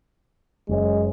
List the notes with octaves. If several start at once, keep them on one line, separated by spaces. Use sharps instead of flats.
F#1 F#2 G#3